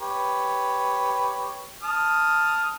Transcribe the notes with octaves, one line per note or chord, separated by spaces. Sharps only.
G4 B4 C#5
A5 D#6 F6